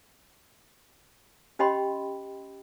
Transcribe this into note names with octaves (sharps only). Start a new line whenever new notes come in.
C#4 G4 D#5 G5 B5 C6